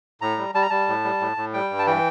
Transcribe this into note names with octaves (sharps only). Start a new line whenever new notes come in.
A2 A#5
G3
G3 A5
A#5
G3 A5
A2
G3
A2
A2
G3 G5
G2
A5
E3 G5